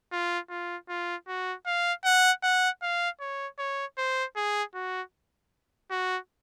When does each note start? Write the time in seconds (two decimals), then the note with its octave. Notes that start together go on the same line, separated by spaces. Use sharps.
0.12 F4
0.50 F4
0.89 F4
1.28 F#4
1.66 F5
2.05 F#5
2.43 F#5
2.82 F5
3.20 C#5
3.59 C#5
3.98 C5
4.36 G#4
4.75 F#4
5.91 F#4